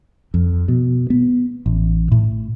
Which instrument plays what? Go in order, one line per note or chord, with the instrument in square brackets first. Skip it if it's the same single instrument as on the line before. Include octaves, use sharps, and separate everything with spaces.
[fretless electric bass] F2
B2
B3
A1
A2